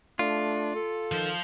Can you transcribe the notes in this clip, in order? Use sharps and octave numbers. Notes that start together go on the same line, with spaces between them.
A3 D4 F4
A4
D#3 F3 C5